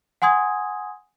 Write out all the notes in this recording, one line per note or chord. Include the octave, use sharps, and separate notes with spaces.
F#5 G#5 C6 D#6 G#6